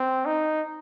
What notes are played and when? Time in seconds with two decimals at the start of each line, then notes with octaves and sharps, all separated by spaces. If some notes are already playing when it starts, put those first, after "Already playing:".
Already playing: C4
0.26 D#4